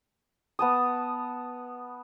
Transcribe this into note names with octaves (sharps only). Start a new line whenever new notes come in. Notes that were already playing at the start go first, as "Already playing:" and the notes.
B3 A5 D#6